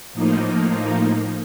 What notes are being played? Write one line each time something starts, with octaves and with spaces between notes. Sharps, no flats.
A2 F3 A#3 D#4